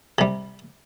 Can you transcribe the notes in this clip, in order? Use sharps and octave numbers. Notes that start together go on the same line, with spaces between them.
C3 G3